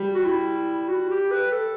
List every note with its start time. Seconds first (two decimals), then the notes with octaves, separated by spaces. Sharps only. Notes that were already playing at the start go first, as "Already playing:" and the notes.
Already playing: G3
0.14 F#4
0.25 E4
0.89 F#4
1.10 G4
1.31 B4
1.51 A4